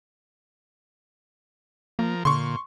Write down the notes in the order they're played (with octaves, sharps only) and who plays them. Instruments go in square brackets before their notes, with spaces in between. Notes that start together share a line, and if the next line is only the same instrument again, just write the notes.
[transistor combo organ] F3 A#4 [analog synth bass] A#3
[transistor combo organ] A#2 [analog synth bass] D3 [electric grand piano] C6 C#6